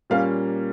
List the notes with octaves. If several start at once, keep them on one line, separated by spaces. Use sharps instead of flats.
A#2 G3 A#3 C#4 F5